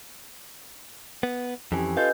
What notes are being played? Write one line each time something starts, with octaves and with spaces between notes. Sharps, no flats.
B3
F2 E3 C#4 G4 G#5
F4 A4 B4 D#5 F5 G6